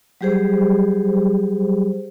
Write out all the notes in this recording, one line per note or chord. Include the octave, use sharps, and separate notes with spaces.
F#3 G3 G4 G#4 C5